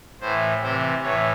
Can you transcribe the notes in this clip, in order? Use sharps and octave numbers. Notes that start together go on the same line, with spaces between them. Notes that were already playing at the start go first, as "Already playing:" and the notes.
A2 E3 C5
C3 E3 C5
A2 E3 C#5